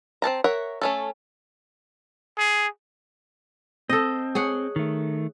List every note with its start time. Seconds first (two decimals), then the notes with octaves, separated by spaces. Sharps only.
0.22 C4 A4 A5 A#5
0.44 A#4 C#5 E5 F#5
0.82 A3 C#4 A4
2.38 G#4
3.90 C4 A4 D#5
4.35 G#4 C#5 F#5
4.76 D#3 A3